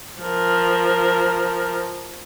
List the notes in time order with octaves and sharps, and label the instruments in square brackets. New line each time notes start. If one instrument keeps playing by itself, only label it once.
[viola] F3 A#4